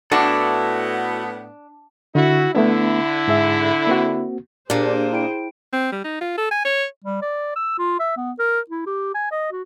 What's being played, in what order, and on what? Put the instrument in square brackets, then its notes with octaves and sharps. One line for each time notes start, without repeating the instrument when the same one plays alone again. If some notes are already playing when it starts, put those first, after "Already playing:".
[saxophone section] A2 B3 [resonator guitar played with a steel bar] D4 [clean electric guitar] E4 F#4 A4
[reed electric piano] D3 [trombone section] E4 F#4
[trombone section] D3 E4 [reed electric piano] A3 B3 D4
[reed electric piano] G#2 G#4 E5
A#3 C4 F#4
[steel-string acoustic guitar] A#2 A#3 [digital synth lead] D4 [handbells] G4 [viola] G#4 C5
[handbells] E4 G5 D7
[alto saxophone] C4
G3
D#4
F4
A4
G#5
C#5
[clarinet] G3
D5
E6
F4
E5
B3
A#4
E4
G4
G#5
D#5
F#4